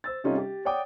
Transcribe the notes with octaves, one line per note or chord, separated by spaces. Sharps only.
C5 E6 A6
C3 G3 C#4 D#4 F4 A4
G4
C#5 D5 F#5 G5 D6 D#6